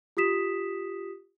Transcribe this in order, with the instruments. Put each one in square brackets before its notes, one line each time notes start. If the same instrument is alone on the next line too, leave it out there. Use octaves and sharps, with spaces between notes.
[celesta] F4 G4 D#6 B6 E7